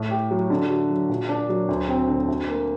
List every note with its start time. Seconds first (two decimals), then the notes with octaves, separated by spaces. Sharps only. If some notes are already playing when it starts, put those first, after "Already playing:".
Already playing: A2
0.11 G4
0.31 F#3
0.50 D3
0.70 F#4
0.90 F#3
1.09 A#2
1.29 D4
1.49 F#3
1.68 D2
1.88 C4
2.08 D3
2.28 D2
2.48 A#3